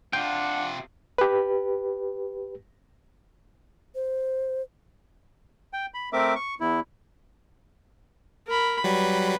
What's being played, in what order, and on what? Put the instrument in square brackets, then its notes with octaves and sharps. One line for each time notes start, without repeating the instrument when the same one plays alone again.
[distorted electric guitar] C3 F4 [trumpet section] D4 F#5 [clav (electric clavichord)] G5
[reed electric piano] G4 B4
[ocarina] C5
[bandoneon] G5
B5
A3 C4 A#4 E5 D6
C#6
E2 E4
[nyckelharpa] A#4 B5
[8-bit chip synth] F#3 G3 [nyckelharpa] B4